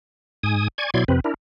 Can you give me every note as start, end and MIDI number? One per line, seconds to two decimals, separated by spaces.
0.43 0.68 44
0.43 0.68 80
0.43 0.68 87
0.78 0.90 74
0.78 0.90 80
0.78 0.90 85
0.78 0.90 92
0.94 1.04 47
0.94 1.04 54
0.94 1.04 64
0.94 1.04 74
0.94 1.04 84
0.94 1.04 92
1.08 1.20 41
1.08 1.20 48
1.08 1.20 60
1.08 1.20 71
1.24 1.34 62
1.24 1.34 64
1.24 1.34 70